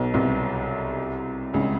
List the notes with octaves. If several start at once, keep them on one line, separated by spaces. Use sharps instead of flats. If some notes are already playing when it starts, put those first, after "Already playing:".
Already playing: B1 B2
C2 C3
C#2 C#3